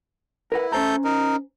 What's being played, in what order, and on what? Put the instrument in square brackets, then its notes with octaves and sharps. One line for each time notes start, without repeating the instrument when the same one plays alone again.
[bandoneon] E4 [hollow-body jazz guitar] A#4 B4 F#5
[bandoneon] A3 A4 G6 [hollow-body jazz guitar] C#4 C5 A#5
[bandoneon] D#4 A#4